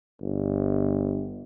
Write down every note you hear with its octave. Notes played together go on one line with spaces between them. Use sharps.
G1